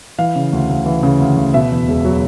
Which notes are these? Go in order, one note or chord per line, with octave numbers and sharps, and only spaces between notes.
E3 F5
C#3
D2
D2
E3
C#3
D2
D2
B2 E5
E2
E1
F#3